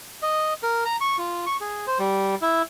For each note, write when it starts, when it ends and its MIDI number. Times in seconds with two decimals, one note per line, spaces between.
0.22 0.54 75
0.63 0.84 70
0.85 0.97 82
1.01 1.17 85
1.18 1.45 65
1.46 1.57 85
1.61 1.86 68
1.87 1.98 72
1.99 2.35 55
2.42 2.62 64